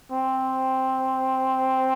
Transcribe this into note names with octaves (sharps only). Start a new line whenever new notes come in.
C4